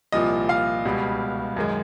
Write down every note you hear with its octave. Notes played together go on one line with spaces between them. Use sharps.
C2 A#2 F3 D#5
F5
C#2 B2 G3
F#2 D#3 G#3